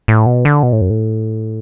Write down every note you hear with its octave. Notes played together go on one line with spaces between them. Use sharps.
A2
B2
D3
B2
A2
F#2
A2